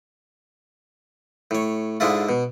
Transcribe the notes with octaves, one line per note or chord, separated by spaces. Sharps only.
A2 C#5
G#2 D3 G#3 D4 E4 F4
B2